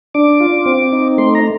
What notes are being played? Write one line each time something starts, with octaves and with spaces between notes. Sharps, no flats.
D4 D6
F4
C4
D#4
A3 C6
A#5